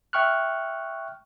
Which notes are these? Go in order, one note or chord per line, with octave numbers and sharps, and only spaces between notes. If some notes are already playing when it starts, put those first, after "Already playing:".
E5 G5 C#6 F6 F#6